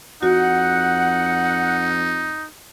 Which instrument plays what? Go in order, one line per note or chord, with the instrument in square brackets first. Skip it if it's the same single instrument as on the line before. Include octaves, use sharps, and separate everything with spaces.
[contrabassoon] F2 [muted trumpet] D#4 [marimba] F#4 [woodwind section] F#5